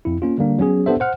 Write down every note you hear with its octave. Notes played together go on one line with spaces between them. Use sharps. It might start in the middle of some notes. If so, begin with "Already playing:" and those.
F2 E4
A#3 C#4 F4
D3 G3 A#3 D4
F#3 B3 C#4 G#4
B3 D4 G4 A4 C5 E5
C5 F#5 F6